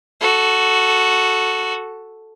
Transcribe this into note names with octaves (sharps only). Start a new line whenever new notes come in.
F#4 A4